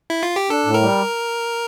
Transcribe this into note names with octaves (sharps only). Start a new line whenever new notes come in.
E4
F4
G4
D4 A4
A2
A#4
G3